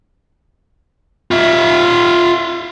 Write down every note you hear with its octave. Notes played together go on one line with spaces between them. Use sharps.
F4 E5